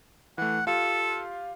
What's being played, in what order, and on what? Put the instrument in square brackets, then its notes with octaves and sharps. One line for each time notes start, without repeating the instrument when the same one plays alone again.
[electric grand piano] E3 A3 [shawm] F#5
[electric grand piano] F4 G4 F5 [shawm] A4